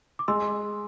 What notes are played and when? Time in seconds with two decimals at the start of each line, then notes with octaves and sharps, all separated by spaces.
0.19 D6
0.28 G#3 C6 E6